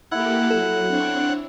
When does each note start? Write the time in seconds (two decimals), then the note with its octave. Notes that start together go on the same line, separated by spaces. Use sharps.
0.11 A#3 E4 G4 A4 F#5
0.50 F#3 A4
0.88 C4 D4 C#5